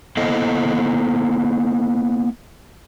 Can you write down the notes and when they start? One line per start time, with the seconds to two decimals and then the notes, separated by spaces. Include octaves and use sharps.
0.17 A#3 B3 E4 A4 C5 D#5